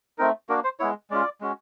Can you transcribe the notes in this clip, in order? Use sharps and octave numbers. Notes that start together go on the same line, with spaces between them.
A3 C4 D#4 A#4
A#3 D4 F#4 A#4
C5
G#3 B3 E4 C#5
G#3 C#4 F4 D5
G#3 C#4 F#4